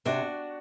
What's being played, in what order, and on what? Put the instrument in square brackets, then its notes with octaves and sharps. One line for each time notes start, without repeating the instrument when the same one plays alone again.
[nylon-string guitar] C3 [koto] D4 F#4